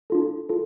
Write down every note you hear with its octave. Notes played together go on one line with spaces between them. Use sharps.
D4 F4 A4
F4 A4